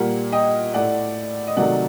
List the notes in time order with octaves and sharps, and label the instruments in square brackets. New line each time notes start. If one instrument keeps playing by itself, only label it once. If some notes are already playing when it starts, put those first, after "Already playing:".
Already playing: [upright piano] A#2 G3 A#3 F#5
D#5 G5
A2 A3 D5 F#5
D#5
C3 D#3 F#3 A3 D5 F#5